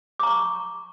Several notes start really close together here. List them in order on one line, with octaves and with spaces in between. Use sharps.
D6 A#5 C#6